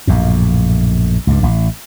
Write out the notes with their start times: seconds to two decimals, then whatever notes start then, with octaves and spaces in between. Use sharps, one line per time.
0.07 A#1 F#2 A2
1.27 C#2 G2
1.43 A1